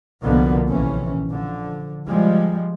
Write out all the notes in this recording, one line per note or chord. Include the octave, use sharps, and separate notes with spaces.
C2 B2 D3 F3 A#3 B3
A#1 C3 E3 C#4
D3 F3
F3 G3 G#3